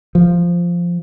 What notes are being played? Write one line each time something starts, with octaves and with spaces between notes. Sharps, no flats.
F3